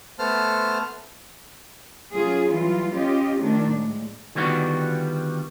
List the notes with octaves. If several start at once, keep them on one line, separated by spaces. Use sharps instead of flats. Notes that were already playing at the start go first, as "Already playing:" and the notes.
A3 B3 C5 A5 F6
F#3 C#4 F4 G#4
E3 F#3 G3 F4
C#4 F4 G4 D#5
D#3 F3 A3 D4
A2 G#3
D3 D#3 G3 B3 F4 F#4